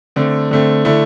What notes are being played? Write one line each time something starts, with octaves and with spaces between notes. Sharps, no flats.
D3 A3 C4
D3 A3 C4
D3 A3 E4